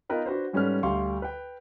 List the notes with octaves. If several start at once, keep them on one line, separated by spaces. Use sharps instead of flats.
B3 D#4 F4 A#4 B4 G5
D4 F#4 B4 C5
G#2 G3 C#4 A4 B4 F6
D2 G3 G4 F5 C6 C#6
B4 G5